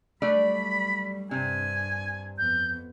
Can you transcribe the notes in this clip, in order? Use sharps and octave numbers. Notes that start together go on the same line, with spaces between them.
F#3 G3 A3 D4 D5 B5
G2 C3 C4 D4 G#5
F2 B3 G6